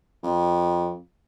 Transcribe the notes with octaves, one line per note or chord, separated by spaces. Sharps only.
F2